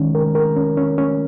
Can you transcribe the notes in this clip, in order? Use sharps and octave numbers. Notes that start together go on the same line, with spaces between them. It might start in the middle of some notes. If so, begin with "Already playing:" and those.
Already playing: D#3 G#3 C#4
A#4
A#4
C#4
C#4
C#4